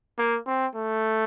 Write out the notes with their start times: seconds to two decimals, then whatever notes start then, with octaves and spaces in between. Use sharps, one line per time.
0.18 A#3
0.47 C4
0.75 A3